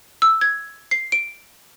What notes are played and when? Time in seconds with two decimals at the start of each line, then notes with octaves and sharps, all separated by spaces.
0.22 E6
0.41 G#6
0.91 C7
1.12 D7